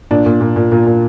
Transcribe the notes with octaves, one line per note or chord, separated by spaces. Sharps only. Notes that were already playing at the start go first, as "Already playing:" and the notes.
A#2 D4
A#2
A#2
A#2
A#2
A#2